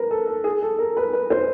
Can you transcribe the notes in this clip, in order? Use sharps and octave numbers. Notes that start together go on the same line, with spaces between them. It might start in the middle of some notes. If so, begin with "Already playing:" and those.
Already playing: A#4 B4
A4
A4
G#4
A4
A#4
B4
B4
C5